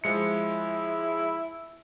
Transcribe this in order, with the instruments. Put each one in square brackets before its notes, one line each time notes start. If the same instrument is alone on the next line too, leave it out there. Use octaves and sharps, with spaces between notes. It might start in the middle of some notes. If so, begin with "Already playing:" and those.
[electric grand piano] F3 G#3 C#7 [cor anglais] E4